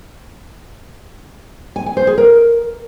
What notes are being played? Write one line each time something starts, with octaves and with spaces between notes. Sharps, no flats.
G#5
G#5
C5
G#4
A#4